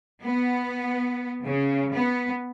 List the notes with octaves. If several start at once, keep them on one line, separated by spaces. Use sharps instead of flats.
B3
C#3
B3